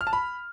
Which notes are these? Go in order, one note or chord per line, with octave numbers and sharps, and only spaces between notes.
F6
A5
B5